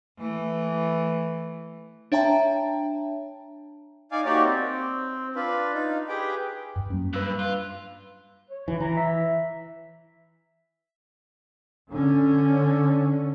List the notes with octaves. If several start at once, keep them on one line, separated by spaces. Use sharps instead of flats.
E3 A3
D4 C#5 E5 G5 A5 A#5
D#4 D5 F5 G#5
A#3 D#4 F#4 G4 C#5 D5
C4
D4 F4 B4
D#4 F4
G4 G#4 B4 G5
G2
F#2 G3 A#3
G2 B4 E6 F#6
F4
C#5
E3
E3 A#5
E5
D3 C#4